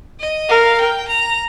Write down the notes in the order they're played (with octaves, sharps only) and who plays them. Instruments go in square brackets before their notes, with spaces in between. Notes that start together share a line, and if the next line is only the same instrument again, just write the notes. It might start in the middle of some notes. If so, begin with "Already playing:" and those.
[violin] D#5
[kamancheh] A#4 [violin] F5
[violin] G5
A#5